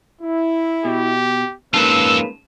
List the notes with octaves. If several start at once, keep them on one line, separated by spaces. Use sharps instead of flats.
E4
B2 G4
G#2 A#3 C#4 F4 A4 B4 A5 E6